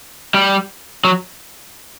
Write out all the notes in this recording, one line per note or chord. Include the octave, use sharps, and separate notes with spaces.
G3
F#3